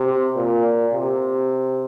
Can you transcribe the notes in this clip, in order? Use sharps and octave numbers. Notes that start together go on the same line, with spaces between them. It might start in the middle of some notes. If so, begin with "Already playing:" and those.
Already playing: C3
A#2
C3